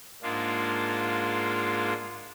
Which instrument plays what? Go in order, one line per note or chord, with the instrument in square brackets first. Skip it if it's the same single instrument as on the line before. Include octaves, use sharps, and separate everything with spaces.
[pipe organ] G#2 G#3 A#3 D4 F4